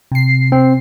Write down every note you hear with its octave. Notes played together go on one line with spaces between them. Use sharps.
C3 C7
C4